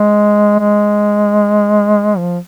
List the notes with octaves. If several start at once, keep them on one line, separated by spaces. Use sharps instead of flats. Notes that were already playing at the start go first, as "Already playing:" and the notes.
Already playing: G#3
G#3
F3